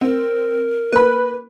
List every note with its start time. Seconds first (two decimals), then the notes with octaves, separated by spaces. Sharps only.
0.01 C4 A#4
0.92 A#3 B4 B5